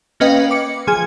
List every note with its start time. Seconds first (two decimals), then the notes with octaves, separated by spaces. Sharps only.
0.20 A#3 C#4 B4 D#5 F5 G5
0.51 D6 C#7
0.87 F3 G#4 G#5 G#6